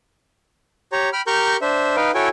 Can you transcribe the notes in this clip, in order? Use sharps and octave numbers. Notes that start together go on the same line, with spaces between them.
G4 C#5 A#5
G5 B5 F6
G4 A#4 A#5 C#6 F6 G6
D4 C5 E5
D#4 B4 F5 G5
E4 F#4 A4 C#5 G5 G#5